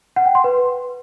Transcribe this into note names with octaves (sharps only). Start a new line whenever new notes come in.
F#5
G5
C6
B4